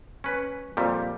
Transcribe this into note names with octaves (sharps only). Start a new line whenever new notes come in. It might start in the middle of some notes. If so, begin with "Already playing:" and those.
C#4 B4
F2 A#2 G3